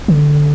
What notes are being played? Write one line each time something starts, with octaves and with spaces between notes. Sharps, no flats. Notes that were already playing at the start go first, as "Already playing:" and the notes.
D3